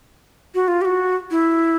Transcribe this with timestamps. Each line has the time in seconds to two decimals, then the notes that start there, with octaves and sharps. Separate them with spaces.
0.55 F#4
0.68 F4
0.81 G4
0.85 F#4
1.31 E4